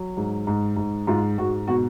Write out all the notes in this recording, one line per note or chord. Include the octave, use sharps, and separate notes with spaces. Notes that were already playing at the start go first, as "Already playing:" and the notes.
Already playing: F#3
G#2
G#2
G#2
G#2 F4
G#2 F#4
B2 F#4